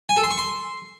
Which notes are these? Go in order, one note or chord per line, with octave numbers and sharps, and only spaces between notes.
G#5
A4
C6
C#6
C6